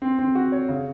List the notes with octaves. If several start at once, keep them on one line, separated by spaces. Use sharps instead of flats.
C4
C4
F#4
C#5
C#3